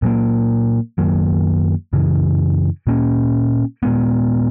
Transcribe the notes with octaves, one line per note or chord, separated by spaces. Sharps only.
A#2 F#3 A#3
F#2 D#3 F#3 A#3
F#2 C#3 E3
A#2 A#3 C#4
A#2 G#3 B3